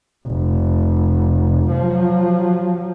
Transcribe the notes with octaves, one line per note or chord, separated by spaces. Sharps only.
F1
F3 F#3